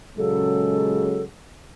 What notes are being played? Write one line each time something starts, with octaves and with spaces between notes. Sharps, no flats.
A#2 C#3 F#3 G#3 A4